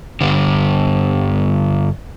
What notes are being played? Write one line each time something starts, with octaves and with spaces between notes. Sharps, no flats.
G2 D3